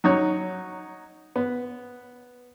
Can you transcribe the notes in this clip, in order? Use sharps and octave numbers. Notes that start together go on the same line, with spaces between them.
F#3 D#4 C#5
B3